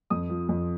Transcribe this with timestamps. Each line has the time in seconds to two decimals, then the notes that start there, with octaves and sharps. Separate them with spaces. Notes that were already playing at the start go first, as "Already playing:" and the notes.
0.10 F2 D#6
0.30 F3
0.49 F2